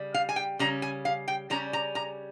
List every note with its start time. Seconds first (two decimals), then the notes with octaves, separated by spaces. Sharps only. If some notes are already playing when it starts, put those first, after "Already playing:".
Already playing: C#3 G3
0.14 F5
0.29 G#5
0.36 G5
0.59 C#3 G3 C#4 A#5
0.82 G#5
1.05 F5
1.28 G5
1.50 C#3 G3 C#4 A#5
1.73 A#5
1.95 A#5